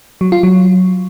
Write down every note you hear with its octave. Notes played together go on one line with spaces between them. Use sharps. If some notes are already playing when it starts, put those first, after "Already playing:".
F#3
F4
F#3